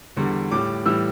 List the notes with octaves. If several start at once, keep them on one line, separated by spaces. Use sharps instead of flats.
E2 D3 G3
A2 G3 D6
A2 E3 G3 E6